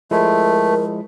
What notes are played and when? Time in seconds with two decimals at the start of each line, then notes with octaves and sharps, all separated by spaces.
0.11 F3 G#3 A3 E4 A#4